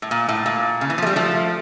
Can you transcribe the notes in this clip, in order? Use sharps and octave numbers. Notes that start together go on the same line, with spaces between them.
A2
A#2
A2
A#2
C#3
E3
F3
A3
G3
F3 A3